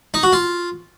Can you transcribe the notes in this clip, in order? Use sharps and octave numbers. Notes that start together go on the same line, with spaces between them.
D#4
F#4
F4